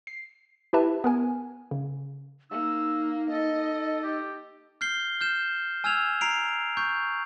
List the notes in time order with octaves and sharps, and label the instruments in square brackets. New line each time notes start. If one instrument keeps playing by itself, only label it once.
[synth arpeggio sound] C7
E4 G4 B4 E5 A5
B3 A#4 G#5
C#3
[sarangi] A#3 [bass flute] D#4 [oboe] E6
[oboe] A4 [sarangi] D#5
[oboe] G4
[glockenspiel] F6 G6 C7 G7
F6 G6 E7
G#5 E6 F6 G#6 E7 F7
A#5 C7 D7 F7
C#6 G6